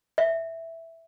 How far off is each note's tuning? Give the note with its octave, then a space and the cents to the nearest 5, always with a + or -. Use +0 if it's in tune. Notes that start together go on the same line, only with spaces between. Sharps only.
E5 +0